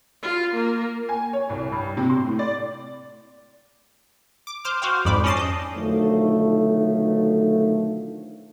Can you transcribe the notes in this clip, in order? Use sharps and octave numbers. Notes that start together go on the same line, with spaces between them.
F4
A#3
G#5
C#5
C2
G2
C3
C6
A2
D5
D6
C5 D6 F6
F#4 C5 F5 G5
F2 G#2 D5 B5
C#4 D5 D#5 A5 A6 C7
D#5 G6
B1 D3 D#3 F3 A3